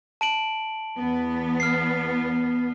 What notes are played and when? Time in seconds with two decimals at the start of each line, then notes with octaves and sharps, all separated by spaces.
0.21 A5 D7 F#7
0.98 E2 B3
1.60 F6 C7